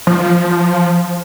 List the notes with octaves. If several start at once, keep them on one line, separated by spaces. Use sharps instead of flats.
F3